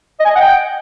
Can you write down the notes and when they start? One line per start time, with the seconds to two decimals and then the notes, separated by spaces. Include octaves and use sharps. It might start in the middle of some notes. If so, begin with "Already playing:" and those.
0.20 D#5
0.25 G#5
0.30 D#5
0.35 F#5
0.41 G5